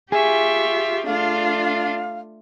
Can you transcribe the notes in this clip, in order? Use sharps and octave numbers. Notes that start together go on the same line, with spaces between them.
F4 G4 G#4 E5 C#6
A3 D4 F4 F5